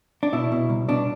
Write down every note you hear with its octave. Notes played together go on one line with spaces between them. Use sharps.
D4
B2 E4
B2
C2
B2 D4